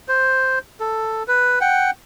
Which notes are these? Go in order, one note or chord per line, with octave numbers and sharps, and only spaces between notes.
C5
A4
B4
F#5 G5